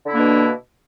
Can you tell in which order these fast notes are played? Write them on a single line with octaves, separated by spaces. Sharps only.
D3 E4 D4 A#3 B2